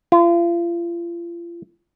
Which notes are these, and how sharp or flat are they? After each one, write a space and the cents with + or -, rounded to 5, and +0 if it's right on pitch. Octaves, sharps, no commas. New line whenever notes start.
F4 -35